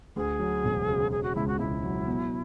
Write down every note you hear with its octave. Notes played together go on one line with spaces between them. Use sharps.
D2 G#4
F#3
E1
C#3
C#3 G#4
F#4
C#2 E4
F#4
C#2 E4
F#3
B2